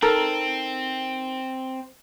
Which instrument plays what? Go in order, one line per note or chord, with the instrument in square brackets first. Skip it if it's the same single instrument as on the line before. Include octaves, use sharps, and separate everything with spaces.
[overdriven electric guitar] C4 [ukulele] D#4 A4 A#4